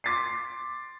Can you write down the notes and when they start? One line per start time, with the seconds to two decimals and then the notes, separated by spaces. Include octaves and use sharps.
0.04 C6 D6 A6 B6 C7